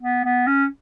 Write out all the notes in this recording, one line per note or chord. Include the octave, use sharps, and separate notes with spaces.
B3
B3
C#4